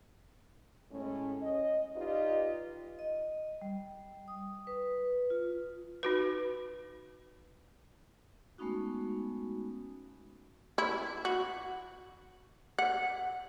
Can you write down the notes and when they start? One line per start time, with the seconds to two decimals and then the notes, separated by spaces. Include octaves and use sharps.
0.92 A2 G#3 C#4
1.42 D#5
1.95 D#4 F4 G4 B4 D5 D#5
2.99 D#5
3.61 G3
4.28 D#6
4.67 B4
5.30 F4
6.03 D#4 F#4 B4
8.58 G#3 A3 B3 C#4 D#4 F#4
10.78 E4
11.25 F#4
12.79 F#5